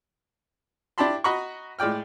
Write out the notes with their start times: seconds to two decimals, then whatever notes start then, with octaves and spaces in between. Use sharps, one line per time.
0.98 D4 E4 G4 A5 B5 C6
1.24 F#4 D#5 A#5 B5 C#6
1.79 A2 G#3 D5 G5 F6